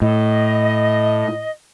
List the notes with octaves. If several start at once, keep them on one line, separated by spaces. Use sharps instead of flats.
A2 D#5